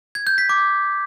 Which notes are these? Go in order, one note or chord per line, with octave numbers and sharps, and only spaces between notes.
G#6
G6
B6
D6